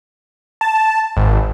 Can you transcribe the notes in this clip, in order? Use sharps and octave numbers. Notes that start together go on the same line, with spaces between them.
A5
G#1